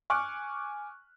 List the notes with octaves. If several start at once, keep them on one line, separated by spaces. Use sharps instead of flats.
G#5 C#6 D6 F6 F#6